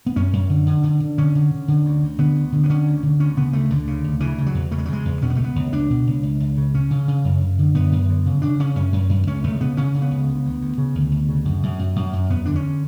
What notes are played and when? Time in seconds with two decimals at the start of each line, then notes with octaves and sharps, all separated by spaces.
0.06 B3
0.16 F#2 C#4
0.33 F#2
0.50 D3
0.66 D3
0.83 D3
1.00 D3
1.18 D3 C#4
1.35 D3
1.51 D3
1.68 D3
1.85 D2
2.02 D2
2.18 D3 B3
2.36 D2
2.52 D3
2.63 B3
2.69 D3 C#4
2.86 D2
3.03 D3
3.20 D2 C#4
3.37 C#3 B3
3.53 D2 A3
3.70 D2 D3
3.87 C#3
4.04 D2
4.20 C#3 E3
4.38 C#3
4.46 F#3
4.55 E2
4.71 C#3 A3
4.78 G#3
4.85 F#3
4.89 C#3 G#3
5.05 E2
5.22 B2 C#4
5.30 B3
5.36 C#2 A3
5.44 B3
5.56 C#2
5.73 C#2 D4
5.90 B2
6.07 C#2
6.23 C#2
6.40 C#2
6.57 C#3
6.74 C#3 C#4
6.91 C#3
7.08 C#3
7.25 F#2
7.41 F#2
7.59 D3
7.75 F#2 B3
7.92 F#2
8.09 D3
8.26 C#3
8.42 C#3 D4
8.60 C#3 C#4
8.75 F#2 C#4
8.93 F#2
9.10 F#2
9.27 C#2 C#4
9.44 C#2 A3
9.61 C#3 B3
9.77 C#3 C#4
9.94 C#3
10.02 B3
10.11 C#2
10.28 D2
10.45 D2
10.61 D2
10.78 C#3
10.95 D2
11.12 D2
11.29 C#3
11.45 F#2
11.63 F#2
11.79 F#2
11.96 F#2
12.13 F#2
12.30 E2 B3
12.46 D3 D4
12.56 C#4